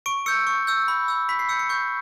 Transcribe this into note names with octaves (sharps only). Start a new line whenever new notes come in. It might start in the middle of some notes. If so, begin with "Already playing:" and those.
C#6 D7
E6 G6 C#7
C#6
E6 G6
B5
E6 G6
B5 B6
C7
E6 G6 C#7
C#7
C#6 G6